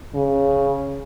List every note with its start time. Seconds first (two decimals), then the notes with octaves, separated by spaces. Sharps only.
0.15 C#3